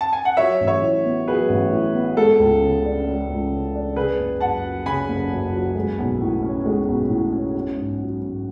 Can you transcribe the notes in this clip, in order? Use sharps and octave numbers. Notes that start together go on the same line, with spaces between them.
A5
G#5
F#5
F#3 C#5 E5
A1
C#5 E5
A2
B3
F#3 G#4 B4
A1
A2
B3
G#3 A4
C#2
C#3
D4
G#3
C#2
C#3
D4
C#3 G#4 B4
F#1
F#2 F#5 A5
F#3
C#3 G#5 B5
F#1
F#2
F#3
G#3
B1
A2
C#4
G#3
B1
A2
C#4
C#4
G#2
F#3
G#2